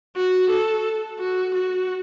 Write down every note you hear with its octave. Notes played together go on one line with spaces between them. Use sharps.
F#4
A4
F#4
F#4